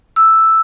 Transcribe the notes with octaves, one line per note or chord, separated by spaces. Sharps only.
E6